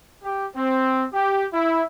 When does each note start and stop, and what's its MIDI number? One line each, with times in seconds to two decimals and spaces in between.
0.23 0.46 67
0.56 1.05 60
1.13 1.46 67
1.51 1.82 64